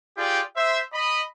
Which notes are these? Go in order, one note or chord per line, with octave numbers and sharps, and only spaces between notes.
F4 G4 G#4 D5 G5
C5 E5
D#5 B5